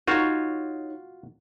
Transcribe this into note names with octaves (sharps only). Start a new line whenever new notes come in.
D#4 F4 F#4 C#5 C#6